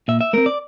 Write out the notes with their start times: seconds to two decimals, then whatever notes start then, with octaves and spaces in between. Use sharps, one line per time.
0.08 A#2 E5
0.21 E5
0.33 A3 C4 A#4
0.46 D5